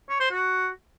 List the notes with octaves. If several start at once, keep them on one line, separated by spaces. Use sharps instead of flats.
C#5
C5
F#4